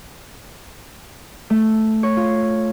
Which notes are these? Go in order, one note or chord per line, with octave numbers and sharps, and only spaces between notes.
A3
C#5
F4